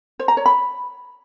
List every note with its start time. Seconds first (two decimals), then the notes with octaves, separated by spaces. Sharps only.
0.19 C5
0.28 A#5
0.37 C#5
0.46 B5